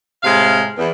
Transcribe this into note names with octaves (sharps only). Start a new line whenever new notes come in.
A2 C3 G#3 F5
E2